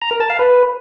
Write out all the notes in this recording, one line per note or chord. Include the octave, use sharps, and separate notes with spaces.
A#5
A#4
A5
F5
B4